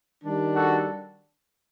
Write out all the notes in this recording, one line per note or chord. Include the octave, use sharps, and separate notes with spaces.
D#3 G3 D4
F#4 A4